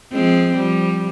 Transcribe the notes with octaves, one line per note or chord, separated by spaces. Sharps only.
F3 G#3 C4
F3 G3